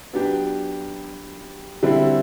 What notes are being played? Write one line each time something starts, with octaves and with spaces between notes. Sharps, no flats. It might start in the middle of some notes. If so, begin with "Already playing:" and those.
F#3 B3 D4 G4
D3 G3 C4 E4